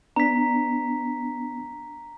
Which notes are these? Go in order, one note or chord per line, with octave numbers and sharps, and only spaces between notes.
B3 D4 A#5 B6